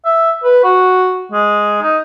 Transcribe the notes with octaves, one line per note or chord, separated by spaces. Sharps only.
E5
B4
F#4
G#3
D#4